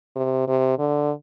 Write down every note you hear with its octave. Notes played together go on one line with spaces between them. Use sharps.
C3
C3
D3